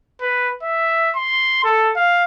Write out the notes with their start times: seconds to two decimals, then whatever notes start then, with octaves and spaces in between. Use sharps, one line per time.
0.21 B4
0.63 E5
1.16 C6
1.65 A4
1.96 F5